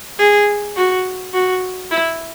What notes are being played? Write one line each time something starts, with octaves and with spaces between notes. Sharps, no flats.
G#4
F#4
F#4
E4